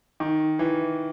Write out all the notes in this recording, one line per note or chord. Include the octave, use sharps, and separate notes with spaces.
D#3
E3